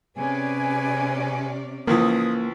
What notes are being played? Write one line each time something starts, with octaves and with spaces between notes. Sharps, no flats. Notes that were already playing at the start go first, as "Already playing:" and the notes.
C3 C#4 G#4 B4 D5 G#5
C#2 E3 F3 A#3 D#6